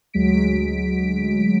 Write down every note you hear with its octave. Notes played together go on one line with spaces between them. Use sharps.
D2 F#3 G#3 B6 D7